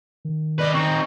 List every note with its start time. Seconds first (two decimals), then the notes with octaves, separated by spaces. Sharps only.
0.25 D#3
0.59 D#4 B4 D5
0.74 C4 D#4 C#6